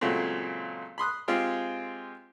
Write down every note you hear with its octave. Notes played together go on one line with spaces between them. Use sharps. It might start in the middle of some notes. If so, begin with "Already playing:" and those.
A#2 C#3 F#3 G#3 A3 C4
B5 C6 D#6 F#6
G#3 C4 F4 G4